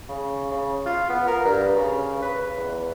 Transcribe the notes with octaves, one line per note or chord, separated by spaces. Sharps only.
C#3
C#3
F4
B3
A#4
G2
C#3
B4
E2